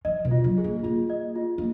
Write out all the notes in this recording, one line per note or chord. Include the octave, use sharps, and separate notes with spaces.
F3 D#5
B2
F4
F#3
G#4
A#3
A#3 F4
D#5
F4
A#3